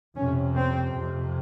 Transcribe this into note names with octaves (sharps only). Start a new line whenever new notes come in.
F2 C3 C#4
C4
F2 C3